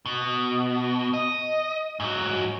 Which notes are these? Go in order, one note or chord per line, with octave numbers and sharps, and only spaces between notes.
B2
D#5
G#2 F#3